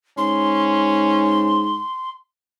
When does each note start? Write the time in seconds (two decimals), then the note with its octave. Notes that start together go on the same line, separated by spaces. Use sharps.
0.18 G#2 C#4 C6